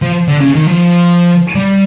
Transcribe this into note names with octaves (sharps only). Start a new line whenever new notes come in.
F3
D3
C#3
D#3
F3
G3